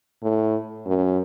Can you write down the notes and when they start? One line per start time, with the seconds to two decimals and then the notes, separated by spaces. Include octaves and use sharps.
0.23 A2
0.86 F#2